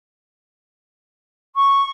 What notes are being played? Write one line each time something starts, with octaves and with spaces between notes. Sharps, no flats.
C#6